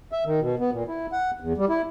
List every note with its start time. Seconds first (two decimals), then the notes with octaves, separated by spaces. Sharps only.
0.12 E5
0.25 D#3
0.40 B2
0.59 B3
0.72 A#2
0.88 E4
1.12 F#5
1.40 E2
1.58 G3
1.69 E4